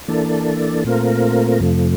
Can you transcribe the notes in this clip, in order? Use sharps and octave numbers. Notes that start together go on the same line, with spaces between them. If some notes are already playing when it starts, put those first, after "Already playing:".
E3 A#3 D4 A4
A#2 A3 C4 F4 A#4
F2 C3 F3 A3